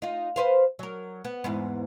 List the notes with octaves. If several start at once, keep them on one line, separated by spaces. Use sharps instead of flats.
D#4 F4
B4 C5 F5
F#3 A#4
B3
E2 G#2 B3